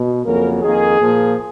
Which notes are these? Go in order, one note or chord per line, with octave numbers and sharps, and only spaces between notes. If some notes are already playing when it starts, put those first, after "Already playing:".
Already playing: B2
F2 C#3 F#3 A#3 A#4
F2 D#3 A#3 G#4
A#2 F3 A#3